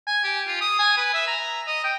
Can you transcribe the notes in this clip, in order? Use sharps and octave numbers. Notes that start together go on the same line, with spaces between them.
G#5
G4
F4
D#6
G#5
B4
E5
A#5
D#5
G5